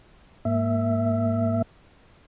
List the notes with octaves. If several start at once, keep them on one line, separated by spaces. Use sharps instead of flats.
G#2 A#3 E5